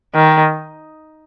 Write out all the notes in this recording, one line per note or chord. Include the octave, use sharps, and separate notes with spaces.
D#3